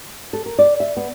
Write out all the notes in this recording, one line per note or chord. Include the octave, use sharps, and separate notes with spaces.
A4
A#4
D5
E5
B3